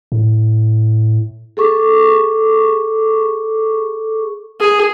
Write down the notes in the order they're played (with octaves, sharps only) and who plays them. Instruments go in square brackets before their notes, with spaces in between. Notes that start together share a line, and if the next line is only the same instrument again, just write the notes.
[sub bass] A2
[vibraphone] G#4 A4 C#6 D6
[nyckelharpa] G#4